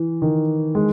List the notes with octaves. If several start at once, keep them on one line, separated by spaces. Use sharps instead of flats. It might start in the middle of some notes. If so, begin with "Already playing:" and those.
Already playing: E3
D#3
G#3